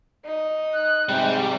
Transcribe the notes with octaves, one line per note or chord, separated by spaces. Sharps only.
D#4
F#6
G#2 C3 G3 G5